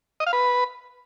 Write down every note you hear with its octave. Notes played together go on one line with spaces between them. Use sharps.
D#5
F5
B4